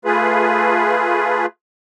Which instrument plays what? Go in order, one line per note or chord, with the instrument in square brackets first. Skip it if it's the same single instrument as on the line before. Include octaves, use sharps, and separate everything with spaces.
[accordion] A3 F4 G#4 B4